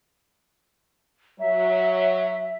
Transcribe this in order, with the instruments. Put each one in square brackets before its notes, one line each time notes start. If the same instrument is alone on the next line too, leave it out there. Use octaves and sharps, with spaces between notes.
[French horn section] F#3 [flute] E5